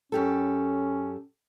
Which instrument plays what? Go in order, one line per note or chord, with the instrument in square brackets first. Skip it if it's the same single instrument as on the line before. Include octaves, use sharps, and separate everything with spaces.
[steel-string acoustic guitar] F#2 G4 A4 [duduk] C#4